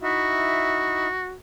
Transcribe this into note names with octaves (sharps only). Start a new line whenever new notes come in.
D#4 E4 F#4 E5